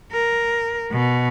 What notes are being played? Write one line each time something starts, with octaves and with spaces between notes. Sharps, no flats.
A#4
B2